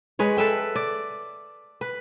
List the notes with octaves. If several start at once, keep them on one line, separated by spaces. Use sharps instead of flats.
G#3 B4 C#5
A4 B4 E5 G5
D5
B4